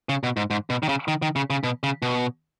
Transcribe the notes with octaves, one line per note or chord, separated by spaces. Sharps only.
C#3
B2
G#2
G#2
B2
D#3
C#3
D#3
D#3
C#3
C#3
B2
C#3
B2